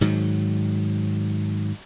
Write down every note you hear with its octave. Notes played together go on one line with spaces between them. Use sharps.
G#2 D#3 F#3